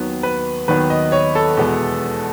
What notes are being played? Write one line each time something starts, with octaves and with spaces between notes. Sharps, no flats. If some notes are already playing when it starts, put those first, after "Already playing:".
Already playing: D#2 D#3 F#3 B3
B4
D#2 D#3 F#3 B3 B4
D#5
C#5
A4
E2 B2 G#3 B3